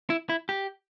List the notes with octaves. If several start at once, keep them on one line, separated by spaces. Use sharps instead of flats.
E4
E4
G4